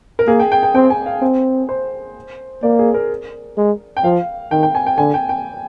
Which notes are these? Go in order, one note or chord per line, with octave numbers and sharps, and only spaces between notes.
A#4
A#3 G#4
G5
G5
G5
C4 G5
G#5
F5
C4
C5
A#3 D5
G#4
A#4
G#3
G5
F3 F5
D#3 G5
G5
G#5
G5
D3 G#5
G5
G5